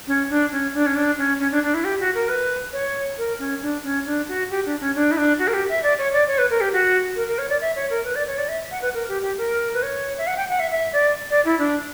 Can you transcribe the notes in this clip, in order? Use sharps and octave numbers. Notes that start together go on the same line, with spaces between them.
C#4
D4
C#4
D4
C#4
D4
C#4
C#4
D4
D4
E4
G4
F#4
A#4
B4
C#5
A#4
C#4
D4
C#4
D4
F#4
G4
D4
C#4
D4
E4
D4
F#4
A#4
G4
E5
D5
C#5
D5
C#5
B4
A#4
G4
F#4
A#4
A#4
C#5
D5
E5
C#5
A#4
B4
D5
C#5
D5
E5
F#5
B4
A#4
G4
G4
A#4
B4
C#5
E5
F#5
G5
F#5
E5
E5
D5
D5
E4
D4